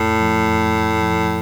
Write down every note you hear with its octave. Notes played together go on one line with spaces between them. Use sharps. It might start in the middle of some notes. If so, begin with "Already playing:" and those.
Already playing: F2 A2
F3
F2
A3
F3